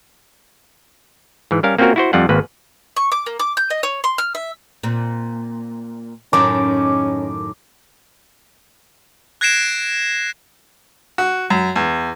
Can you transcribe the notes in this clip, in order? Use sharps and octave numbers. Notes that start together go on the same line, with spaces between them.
G#2 E3
G3 C#4 A#4 F5
A#3 C4 C#4 F4 F#4 A#4
E4 F#4 C5
F2 G3 F4 F#5
G#1 A#3 B4
C#6
D6
A#3
D6
G6
D#5
C#5
C6
F6
E5
A#2 C4
F#2 A2 D#3 C#4 D6
F#6 G#6 A#6 C7 D7 E7
F#4
F#2
E2